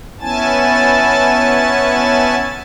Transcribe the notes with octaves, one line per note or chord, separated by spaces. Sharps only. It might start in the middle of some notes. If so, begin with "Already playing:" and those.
B3 C#4 E4 G#5 A5 A6